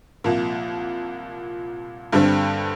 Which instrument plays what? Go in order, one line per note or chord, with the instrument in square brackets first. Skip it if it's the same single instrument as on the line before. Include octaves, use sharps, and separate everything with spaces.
[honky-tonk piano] C2 A#2 F3 A#3
G2 D3 G3 C4